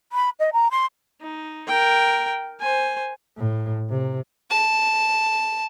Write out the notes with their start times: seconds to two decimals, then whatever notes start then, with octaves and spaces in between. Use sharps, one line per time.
0.12 B5
0.39 D#5
0.53 A#5
0.71 C6
1.21 D#4
1.67 A#4 G5
2.60 C5 G#5
3.37 A2
3.90 C3
4.50 A5